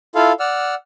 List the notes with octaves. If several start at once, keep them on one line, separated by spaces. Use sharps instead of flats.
E4 F4 A4 F5
D5 F#5 E6 F6